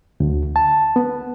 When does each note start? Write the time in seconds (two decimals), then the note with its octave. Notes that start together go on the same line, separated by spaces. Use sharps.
0.20 D2
0.56 A5
0.96 B3